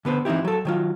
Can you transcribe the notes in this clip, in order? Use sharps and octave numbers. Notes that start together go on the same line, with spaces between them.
D3 B3 B4 C5
E3 C4 D#4 E4 G4
F#3 A4
D#3 F#3 F4